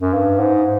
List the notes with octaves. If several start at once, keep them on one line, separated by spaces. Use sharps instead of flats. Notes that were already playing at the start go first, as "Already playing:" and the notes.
F#2
G2
G#2